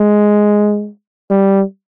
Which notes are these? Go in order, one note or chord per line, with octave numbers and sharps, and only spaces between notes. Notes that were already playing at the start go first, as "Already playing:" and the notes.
Already playing: G#3
G3